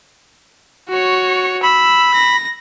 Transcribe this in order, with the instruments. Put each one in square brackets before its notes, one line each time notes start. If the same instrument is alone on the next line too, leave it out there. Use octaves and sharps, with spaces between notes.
[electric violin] F#4 C#5
[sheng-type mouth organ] B5 [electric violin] E6
[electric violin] A#6